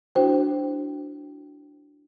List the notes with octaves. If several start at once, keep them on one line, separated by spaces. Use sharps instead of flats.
D4 E4 F#4 C5 G5